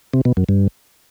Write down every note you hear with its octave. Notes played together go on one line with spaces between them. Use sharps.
C3
B2
F#2
G2